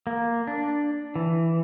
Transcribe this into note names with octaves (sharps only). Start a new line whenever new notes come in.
A#3
D4
E3